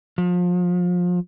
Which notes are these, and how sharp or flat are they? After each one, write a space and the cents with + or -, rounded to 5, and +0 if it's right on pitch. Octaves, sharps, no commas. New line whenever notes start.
F3 +30